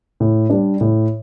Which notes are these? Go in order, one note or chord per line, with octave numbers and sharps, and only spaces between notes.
A2
G3 D4
A2